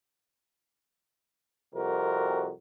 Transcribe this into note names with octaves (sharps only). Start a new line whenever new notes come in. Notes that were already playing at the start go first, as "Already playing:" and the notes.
C2 F2 C3 F#4 A#4